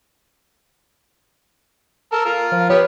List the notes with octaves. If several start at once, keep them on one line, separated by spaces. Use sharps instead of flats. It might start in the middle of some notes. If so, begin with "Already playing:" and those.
A4 A#4 A5
F4 A#4 F6
F3
B3 G4 B4 C#5